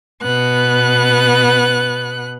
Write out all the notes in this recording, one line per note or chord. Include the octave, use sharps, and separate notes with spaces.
B2 B3 F#6